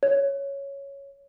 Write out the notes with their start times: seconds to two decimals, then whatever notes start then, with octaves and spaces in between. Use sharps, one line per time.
0.03 C#5